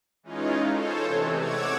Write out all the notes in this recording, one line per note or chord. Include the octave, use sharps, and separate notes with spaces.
E3 G#3 C#4 D#4 F4
A4 C5 C#5
C3 E3 G#3 A3
C#5 F#5 D6 E6 G#6